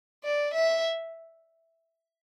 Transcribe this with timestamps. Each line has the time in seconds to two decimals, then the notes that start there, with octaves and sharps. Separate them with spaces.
0.24 D5
0.54 E5